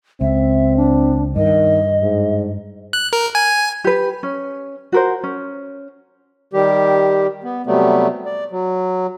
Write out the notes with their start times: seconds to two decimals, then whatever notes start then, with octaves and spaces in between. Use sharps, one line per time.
0.21 C#2 C4 E5
0.77 D4
1.36 G2 D#3 D#5
2.02 G#2
2.93 F#6
3.13 A#4
3.35 G#5
3.84 G4 B4
4.23 C#4
4.92 F#4 A#4 C5
5.23 C#4
6.53 D#3 G3 G4
7.44 B3
7.66 C3 F#3 G3 A3 B3
8.26 D5
8.51 F#3